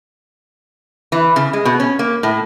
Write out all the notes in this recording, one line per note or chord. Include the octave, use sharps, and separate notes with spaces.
E3
C#3
G#3
B2
C#4
A#3
A2